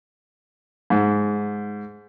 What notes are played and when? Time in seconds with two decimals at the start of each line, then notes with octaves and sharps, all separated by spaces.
0.90 G#2